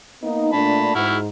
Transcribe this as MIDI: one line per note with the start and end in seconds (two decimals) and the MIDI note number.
0.22 0.52 58
0.22 0.52 59
0.22 0.52 63
0.53 0.95 46
0.53 0.95 57
0.53 0.95 62
0.53 0.95 81
0.53 0.95 83
0.95 1.28 44
0.95 1.16 64
0.95 1.16 66
0.95 1.16 89